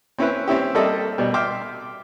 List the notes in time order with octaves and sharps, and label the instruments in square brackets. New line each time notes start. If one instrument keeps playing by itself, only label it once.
[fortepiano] C4 C#4 E4 B4
C4 C#4 E4 G4
G3 A#3 C4 A4 D#5 E5
B2 G3
E5 G5 C6 D6 F6